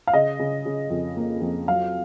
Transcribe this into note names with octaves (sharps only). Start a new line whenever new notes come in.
F5
C#3 D#5
C#3
C#3
F2
A#3
F2
F#3 F5